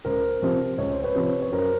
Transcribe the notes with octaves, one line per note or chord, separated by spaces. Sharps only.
C#2 A#4 C5
C3 F3
C#2 C#5
C5
B4 C#5
C3 F3
C#5
F#2 A#4 C5